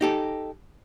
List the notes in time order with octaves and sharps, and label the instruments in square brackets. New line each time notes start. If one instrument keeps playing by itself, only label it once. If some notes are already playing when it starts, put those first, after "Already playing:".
[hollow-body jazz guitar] D#4 G4 A4